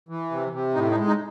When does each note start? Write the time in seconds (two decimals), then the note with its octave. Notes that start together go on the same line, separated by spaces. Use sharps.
0.09 E3
0.31 C3
0.53 C3
0.75 A2 D#4
0.91 D#4
0.97 G#3
1.07 D#4